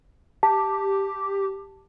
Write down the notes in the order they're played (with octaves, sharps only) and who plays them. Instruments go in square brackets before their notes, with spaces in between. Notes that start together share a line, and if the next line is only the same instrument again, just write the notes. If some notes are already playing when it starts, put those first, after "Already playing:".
[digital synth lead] G4 [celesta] A5